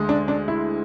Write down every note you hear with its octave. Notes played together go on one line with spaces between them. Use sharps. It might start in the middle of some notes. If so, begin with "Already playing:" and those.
Already playing: D2 D3 G#3
D4
D4
E4